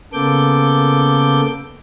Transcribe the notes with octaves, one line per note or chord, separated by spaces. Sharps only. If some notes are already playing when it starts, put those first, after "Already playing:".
C#3 A#3 B3 A4 D6 G6